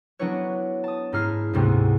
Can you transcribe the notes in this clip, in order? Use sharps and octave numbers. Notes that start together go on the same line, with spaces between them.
F#3 B3 D4 E4 B4 C#5
A5 D#6
G#2 D#4 E4 F6 C7
D2 G#2 C3 A3 B3